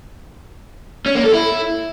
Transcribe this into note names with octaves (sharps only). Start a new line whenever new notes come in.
C#4
A#3
A4
E4